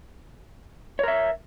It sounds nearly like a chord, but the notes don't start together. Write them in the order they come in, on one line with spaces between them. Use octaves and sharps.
C#5 A#4 E5